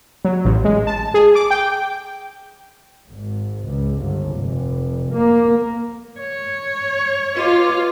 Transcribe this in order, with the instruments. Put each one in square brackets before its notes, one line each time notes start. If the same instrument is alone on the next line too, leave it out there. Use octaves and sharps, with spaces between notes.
[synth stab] F#3
A1
G#3
A5
G#4
D6
G5
[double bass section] G#1
C#2
G1
F1
A#3
[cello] C#5
[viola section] F4 [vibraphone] B4 D#5 D6